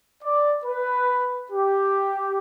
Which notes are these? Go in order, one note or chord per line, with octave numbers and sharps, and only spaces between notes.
D5
B4
G4